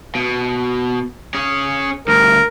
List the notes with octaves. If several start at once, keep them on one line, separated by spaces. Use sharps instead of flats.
B2
C#4 G#4
D2 G2 A#4